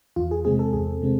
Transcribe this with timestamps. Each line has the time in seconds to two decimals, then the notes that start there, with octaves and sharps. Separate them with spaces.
0.16 E2 F4
0.31 G#4
0.45 C3 G#3 C4 G#4
0.59 A4
0.73 E2 G#4
1.02 C3 G#3 C4